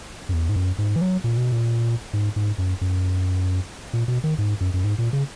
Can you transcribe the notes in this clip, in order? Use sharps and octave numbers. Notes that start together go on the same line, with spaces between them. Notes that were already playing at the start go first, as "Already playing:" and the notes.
F#2
E2
G#2
F#2
G#2
E3
F#3
A#2
B2
A#2
G#2
G#2
F#2
F#2
A#2
B2
D#3
G#2
F#2
F#2
G#2
A#2
C#3